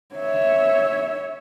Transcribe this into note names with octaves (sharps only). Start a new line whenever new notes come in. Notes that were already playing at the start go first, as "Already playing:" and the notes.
C#5 E5